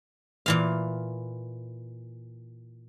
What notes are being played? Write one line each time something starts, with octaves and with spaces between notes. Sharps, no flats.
A#2 E3 F5